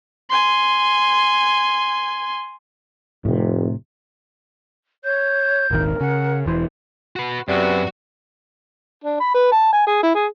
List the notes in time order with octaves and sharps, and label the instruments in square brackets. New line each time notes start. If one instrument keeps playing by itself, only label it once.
[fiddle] G#5 C6
[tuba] F1 [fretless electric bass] A2 C3
[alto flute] C#5 [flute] G6
[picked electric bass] D#1 G#1 D#3 [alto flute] A#4
[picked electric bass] C#3 [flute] F#5
[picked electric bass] E1 E3 [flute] C5
[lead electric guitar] F#4 B4
[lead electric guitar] F#2 [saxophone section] C3 B3 [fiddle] F#4 [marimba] D5
[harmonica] D4
B5
B4
A5
G#5
G#4
E4
G#4